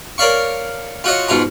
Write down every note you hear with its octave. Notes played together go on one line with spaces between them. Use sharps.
A#4 C#5 D5 F5 C#6
F4 F#4 C#5 D#5
G#2 B2 F4 A#5